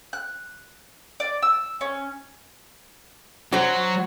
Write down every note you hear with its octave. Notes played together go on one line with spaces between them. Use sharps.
F#6
D5
E6
C#4
F#3 F#4 C5